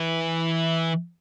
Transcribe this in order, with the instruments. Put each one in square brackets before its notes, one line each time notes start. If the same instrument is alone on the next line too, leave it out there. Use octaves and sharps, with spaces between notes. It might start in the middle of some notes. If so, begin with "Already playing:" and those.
Already playing: [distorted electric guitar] E3